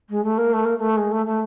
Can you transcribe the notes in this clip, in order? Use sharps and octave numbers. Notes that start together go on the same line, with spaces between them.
G#3
A3
A#3
A3
A#3
A3
G#3
A3
A3